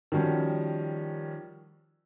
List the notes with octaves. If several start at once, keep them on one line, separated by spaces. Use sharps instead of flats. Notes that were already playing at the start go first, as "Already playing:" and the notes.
D#3 F3 G3 C#4 F#4